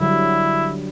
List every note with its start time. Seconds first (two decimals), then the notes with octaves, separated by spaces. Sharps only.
0.01 D3 F#3 G3 E4